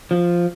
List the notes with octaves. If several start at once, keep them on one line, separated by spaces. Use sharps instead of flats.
F3